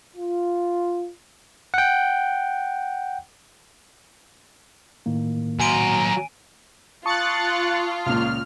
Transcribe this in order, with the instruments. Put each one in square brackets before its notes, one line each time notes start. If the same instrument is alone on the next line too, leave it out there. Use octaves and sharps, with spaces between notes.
[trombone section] F4
[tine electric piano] F#5 G5
A2 D#3 A#3
[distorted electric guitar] F#3 C6 [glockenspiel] G#5 D7 D#7 [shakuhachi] A#5
[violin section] F4 [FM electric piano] A5 C#6 D#6 [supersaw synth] F#6 A6 C#7
[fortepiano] C#2 A#2 [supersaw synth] F6